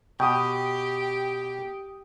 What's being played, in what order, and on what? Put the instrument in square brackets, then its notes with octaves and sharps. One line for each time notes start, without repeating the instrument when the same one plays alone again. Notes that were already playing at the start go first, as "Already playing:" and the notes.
[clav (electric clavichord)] B2 [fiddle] G4 [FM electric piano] G5 D#6